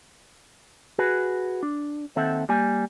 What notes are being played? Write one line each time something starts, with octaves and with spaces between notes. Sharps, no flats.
F#4 G#4 B4
D4
D#2 D#3 C4 A4 E5 F#5
G3 A#3 G#5